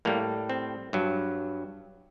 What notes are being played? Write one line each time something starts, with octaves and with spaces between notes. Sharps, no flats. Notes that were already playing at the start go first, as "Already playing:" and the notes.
A2 G3 A#3
C4
G2 F#3